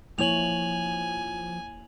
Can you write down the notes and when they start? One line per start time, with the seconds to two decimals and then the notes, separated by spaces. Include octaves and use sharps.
0.19 F3 A#3 E4 C#5 G#5 F7 F#7